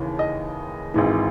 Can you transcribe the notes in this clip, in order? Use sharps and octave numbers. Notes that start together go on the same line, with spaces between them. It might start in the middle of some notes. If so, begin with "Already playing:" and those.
Already playing: D#2 C#3 E3
D#5
G#1 G#2 E3